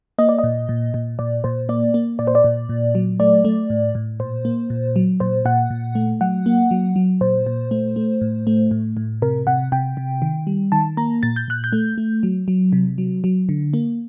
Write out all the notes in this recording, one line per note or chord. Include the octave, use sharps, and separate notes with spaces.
A#3 D#5
D5
A#2 D#5
A#2
A#2
A#2 D5
A#2 C5
A#3 D5
A#3
A#2 D5
C5
D5
A#2
A#2
F#3
A3 D5
A3
A2
A2
A#2 C5
A#3
A#2
F#3
A#2 C5
A#2 F#5
A#2
A3
F#3 F#5
A#3
F#3
F#3
A#2 C5
A#2
A3
A3
A2
A3
A2
A2
C3 A#4
C3 F#5
C3 G5
C3
D#3
G3
D#3 A5
A#3 A#5
A#2 A6
G6
A#2 F#6
G6
A3
A3
F#3
F#3
C3
F#3
F#3
D3
A#3